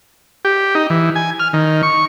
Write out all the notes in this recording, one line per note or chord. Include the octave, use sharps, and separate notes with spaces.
G4
D#4
E3
G#5
F6
D#3
C#6